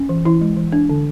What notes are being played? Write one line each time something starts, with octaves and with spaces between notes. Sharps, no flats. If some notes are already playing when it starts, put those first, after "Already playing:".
Already playing: C#4
E3
E3 E4
G#3
E3
D4
D3